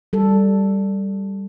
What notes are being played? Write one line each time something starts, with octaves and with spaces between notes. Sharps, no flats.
G3 A4